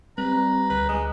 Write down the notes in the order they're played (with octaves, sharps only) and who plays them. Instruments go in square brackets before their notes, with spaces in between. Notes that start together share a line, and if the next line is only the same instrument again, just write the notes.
[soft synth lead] G3 [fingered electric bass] C4 [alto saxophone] B4 [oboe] A#5
[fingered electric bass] D2 [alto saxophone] B4
[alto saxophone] G#3 [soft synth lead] F#6